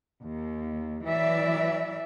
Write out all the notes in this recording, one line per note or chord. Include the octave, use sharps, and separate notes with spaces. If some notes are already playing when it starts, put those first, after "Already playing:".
D#2
E3 F#3 D5 E5